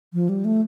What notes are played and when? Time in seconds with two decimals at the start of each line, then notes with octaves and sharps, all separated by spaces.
0.14 F3
0.29 G3
0.45 A3